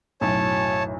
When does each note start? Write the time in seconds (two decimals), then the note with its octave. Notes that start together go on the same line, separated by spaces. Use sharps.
0.21 B1 F#2 A2 C#5 A5